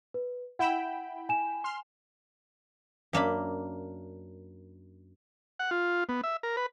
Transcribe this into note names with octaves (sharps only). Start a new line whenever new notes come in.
B4
E4 F#5 G5 B5 E7
G#5 E7
C6 F6
F#2 A#3 D4 B5
F#5
F4
B3
E5
A#4
B4